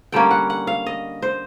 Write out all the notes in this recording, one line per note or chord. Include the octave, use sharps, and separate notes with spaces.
D3 G3 A#3 C#4 G5
F#5
F#5
F5
D#5
C5